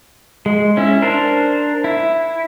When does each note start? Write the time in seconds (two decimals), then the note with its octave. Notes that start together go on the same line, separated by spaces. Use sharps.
0.46 G#3
0.77 C#4 E4
1.02 D4 A#4 C5
1.84 E4